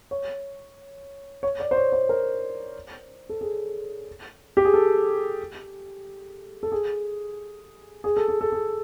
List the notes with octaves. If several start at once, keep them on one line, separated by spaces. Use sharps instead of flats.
C#5
C#5
D5
C5
C#5
C5
A#4
A4
G#4
G4
G#4
A4
A4
G#4
G#4
A4
G#4
A4
G#4